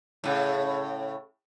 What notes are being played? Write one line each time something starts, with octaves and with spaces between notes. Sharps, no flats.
A2 C#3